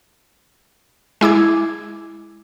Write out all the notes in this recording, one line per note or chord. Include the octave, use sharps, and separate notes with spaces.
G#3 E4 D6 G#6